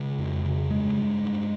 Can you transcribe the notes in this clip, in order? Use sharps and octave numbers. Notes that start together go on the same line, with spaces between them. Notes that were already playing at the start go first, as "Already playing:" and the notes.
Already playing: C#3 G#3
F2
C#3
G2 G#3
G2
G2